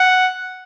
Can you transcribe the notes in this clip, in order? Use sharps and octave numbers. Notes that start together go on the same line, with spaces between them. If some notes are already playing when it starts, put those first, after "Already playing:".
Already playing: F#5